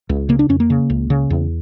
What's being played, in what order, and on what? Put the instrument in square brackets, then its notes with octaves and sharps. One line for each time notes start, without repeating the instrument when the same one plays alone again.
[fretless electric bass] C#2
C#3 A#3
D4
F2 C#4
A#3
C#3
C#2
C#3
E2